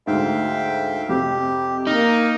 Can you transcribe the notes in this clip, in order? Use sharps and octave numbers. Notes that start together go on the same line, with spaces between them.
D2 G#2 E5 F5 G5
F2 C3 G4
A#3 D#4 F6